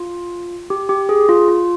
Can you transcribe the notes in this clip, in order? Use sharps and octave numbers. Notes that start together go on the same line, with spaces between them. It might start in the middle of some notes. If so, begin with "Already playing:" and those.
Already playing: F4
G4
G4
G#4
F4
F4